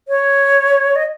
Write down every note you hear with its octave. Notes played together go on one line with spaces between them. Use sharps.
C#5
D#5